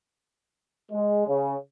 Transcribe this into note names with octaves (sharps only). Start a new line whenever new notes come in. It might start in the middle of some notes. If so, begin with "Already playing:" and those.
G#3
C#3